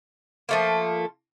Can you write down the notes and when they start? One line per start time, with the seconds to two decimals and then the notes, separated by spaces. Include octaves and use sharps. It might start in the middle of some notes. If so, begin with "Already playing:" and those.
0.49 F3 A3 A#3